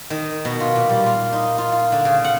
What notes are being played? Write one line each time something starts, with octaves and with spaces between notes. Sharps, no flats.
D#3
B2
F4
A#2
G3
F4
D#4
F4
F4
D3
C#3
F#5